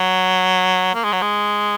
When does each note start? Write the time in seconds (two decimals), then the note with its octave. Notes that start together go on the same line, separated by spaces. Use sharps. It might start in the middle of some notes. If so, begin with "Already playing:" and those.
Already playing: F#3
0.95 A#3
1.04 G#3
1.13 F#3
1.22 G#3